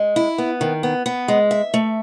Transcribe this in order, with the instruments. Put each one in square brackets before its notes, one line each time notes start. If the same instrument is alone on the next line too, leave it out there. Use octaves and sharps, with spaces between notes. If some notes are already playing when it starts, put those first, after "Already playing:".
Already playing: [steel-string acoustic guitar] G#3
E4
B3
D#3
B3
B3
G#3
E5
A3